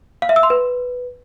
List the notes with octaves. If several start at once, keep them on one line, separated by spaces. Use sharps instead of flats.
F5
E5
E6
C6
B4